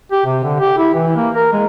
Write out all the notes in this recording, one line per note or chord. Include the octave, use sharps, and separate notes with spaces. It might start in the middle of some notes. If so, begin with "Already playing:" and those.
G4
C3
D3
G4
E4
E3
A#3
A#4
G#3